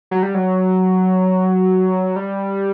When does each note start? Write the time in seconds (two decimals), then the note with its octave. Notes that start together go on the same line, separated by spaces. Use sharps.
0.11 F#3
0.23 G3
0.35 F#3
2.16 G3